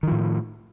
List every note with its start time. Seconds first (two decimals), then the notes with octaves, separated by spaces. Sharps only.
0.03 D#3
0.07 F3
0.12 A2